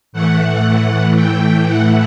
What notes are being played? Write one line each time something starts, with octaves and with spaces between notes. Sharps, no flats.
A2 E3 A3 F#5
G5
F#5